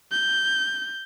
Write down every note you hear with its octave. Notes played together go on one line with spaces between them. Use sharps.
G6